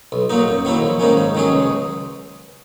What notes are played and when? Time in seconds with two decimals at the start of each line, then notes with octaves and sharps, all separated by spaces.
0.12 B1
0.30 A#2 F#3 A#3 D#4
0.48 F#2
0.65 D#3 F#3 A#3 E4
0.82 A#1
1.00 G#2 D#3 A#3 C#4
1.17 G#2
1.35 D#3 F#3 C#4 G#4
1.52 C#2